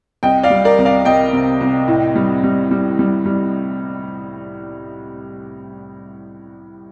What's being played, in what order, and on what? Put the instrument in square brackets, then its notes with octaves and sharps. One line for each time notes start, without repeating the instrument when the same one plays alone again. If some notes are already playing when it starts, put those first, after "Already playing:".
[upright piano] C2 D#5 G5
D5 F5
G3
A#4 D5
C2
D5 F5
C2 D#5 G5
C3
C2
A2
G3
G3
G3
G3
G3